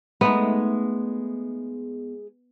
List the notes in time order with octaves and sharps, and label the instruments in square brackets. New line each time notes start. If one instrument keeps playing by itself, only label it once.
[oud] G#3 A3 D#4 [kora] B3